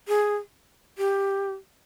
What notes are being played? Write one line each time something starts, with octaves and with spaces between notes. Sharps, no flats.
G#4
G4